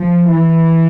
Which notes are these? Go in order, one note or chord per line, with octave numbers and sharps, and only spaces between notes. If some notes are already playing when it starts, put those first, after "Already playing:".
Already playing: F3
E3